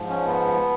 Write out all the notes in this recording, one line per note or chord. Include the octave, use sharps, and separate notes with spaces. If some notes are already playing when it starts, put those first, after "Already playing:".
Already playing: G#2 F3
C#4
B3